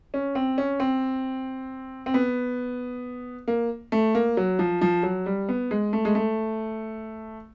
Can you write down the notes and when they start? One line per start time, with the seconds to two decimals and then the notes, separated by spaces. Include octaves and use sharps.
0.14 C#4
0.35 C4
0.58 C#4
0.80 C4
2.06 C4
2.14 B3
3.48 A#3
3.92 A3
4.15 A#3
4.37 F#3
4.59 F3
4.81 F3
5.03 F#3
5.26 G3
5.49 B3
5.71 G#3
5.93 A3
6.05 G#3
6.15 A3